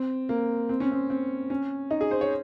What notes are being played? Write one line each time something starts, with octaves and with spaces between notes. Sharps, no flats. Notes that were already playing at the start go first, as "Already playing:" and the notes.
Already playing: C4
A#3
C4
C#4
C4
C4
C#4
D#4
G#4
C5
C#5